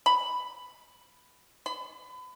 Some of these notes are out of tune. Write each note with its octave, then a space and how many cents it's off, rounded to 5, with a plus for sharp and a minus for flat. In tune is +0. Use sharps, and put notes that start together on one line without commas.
B5 +5
B5 +35